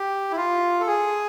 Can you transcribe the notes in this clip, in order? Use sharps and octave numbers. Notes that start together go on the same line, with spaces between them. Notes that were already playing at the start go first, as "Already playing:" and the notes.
Already playing: G4
E4
F4
A4
G#4